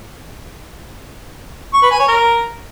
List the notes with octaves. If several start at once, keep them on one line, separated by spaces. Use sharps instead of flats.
C#6
B4
G#5
C#5
A#4